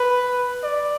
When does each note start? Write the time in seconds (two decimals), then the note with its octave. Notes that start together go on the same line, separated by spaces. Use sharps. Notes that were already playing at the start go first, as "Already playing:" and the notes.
Already playing: B4
0.63 D5